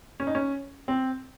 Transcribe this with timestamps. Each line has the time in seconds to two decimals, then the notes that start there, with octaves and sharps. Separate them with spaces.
0.20 C#4
0.27 D#4
0.35 C#4
0.88 C4